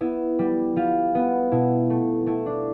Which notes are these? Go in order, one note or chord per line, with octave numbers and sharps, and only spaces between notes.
B3 E4
G3
G3 F4
B3
B2 E4
A3
A3 E4
D4